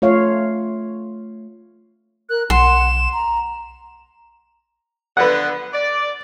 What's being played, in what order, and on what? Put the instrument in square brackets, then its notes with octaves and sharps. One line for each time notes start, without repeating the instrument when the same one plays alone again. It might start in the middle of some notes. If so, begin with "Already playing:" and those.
[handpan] A3 F4 C#5 F5
[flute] A#4 [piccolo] F#6
[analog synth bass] B1 [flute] F#5 [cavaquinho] C6 [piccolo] E7
[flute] A#5
[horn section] D3 B3 [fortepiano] B4 F#5
[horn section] D5